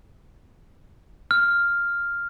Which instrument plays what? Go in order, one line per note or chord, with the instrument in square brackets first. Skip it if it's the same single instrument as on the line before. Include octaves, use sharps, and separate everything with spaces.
[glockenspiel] F6